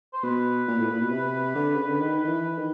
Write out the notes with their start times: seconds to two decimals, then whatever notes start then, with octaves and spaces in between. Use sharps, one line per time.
0.13 C5
0.23 B2 B4
0.68 A#2
0.79 A2
0.90 A#2
1.01 B2
1.11 C3
1.55 D3
1.76 C#3
1.88 D3
2.00 D#3
2.24 D#3
2.29 E3
2.58 D#3